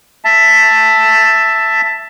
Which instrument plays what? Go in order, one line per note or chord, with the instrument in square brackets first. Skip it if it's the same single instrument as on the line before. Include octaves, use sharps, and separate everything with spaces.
[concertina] E5 A5